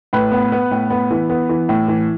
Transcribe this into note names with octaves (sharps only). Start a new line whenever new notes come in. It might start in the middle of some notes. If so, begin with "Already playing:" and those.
A2 B4
B3
B3
A2
B3
E3
B3
E3
A2
E3